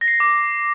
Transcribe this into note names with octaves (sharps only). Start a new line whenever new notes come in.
A#6
C7
A#6
D6